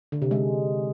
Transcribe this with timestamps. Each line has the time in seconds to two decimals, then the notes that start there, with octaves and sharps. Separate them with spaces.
0.12 D3
0.22 C3
0.31 G#3